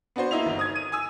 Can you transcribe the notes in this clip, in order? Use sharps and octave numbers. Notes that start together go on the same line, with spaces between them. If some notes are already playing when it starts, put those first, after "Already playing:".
B3 D4 F#4 C5
A#3 D#4 E4 F7
G1
D#6 G#6
D#7
G#5 D#6 E6